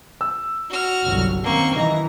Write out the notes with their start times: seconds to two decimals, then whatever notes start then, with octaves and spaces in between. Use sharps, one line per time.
0.21 E6
0.70 F#4 F6
1.05 G1 C2 F#3
1.43 F#2 D#3 A#3 C4 C#6
1.76 D#3 E3 D#4 A#5